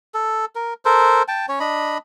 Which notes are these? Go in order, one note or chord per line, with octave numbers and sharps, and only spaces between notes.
A4
A#4
A4 A#4 C5
G5 A5
C#4 C#5
D4 D#5 B5